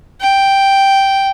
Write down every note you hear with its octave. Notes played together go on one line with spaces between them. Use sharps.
G5